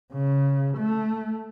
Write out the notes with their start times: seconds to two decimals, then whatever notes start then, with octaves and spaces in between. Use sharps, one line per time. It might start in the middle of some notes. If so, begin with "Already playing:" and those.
0.12 C#3
0.78 A3